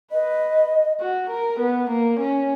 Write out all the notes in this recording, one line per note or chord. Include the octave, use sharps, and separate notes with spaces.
B4 D#5
F#4
A#4
B3
A#3
C#4